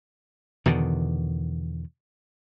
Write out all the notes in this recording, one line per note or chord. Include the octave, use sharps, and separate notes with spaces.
E2 B2 D3 D#3